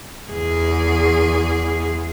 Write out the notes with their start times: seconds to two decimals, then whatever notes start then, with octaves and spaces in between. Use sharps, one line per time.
0.32 E2 G#4